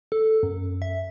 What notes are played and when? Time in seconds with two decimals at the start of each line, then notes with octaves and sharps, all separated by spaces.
0.12 A4
0.43 F#2
0.82 E5